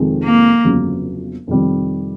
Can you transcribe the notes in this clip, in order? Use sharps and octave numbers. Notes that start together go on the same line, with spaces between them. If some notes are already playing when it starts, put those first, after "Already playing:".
Already playing: F2 C3 D#3 G#3 C4
A#3
G1 F2 C#3 F#3 B3
F2 C3 D#3 G3 C4